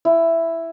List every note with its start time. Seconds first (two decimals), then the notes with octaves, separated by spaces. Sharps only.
0.05 E4